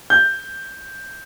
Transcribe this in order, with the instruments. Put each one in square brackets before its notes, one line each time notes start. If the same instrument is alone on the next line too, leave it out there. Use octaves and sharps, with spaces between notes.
[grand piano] G6